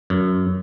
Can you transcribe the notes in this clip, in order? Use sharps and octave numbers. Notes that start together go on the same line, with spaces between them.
F#2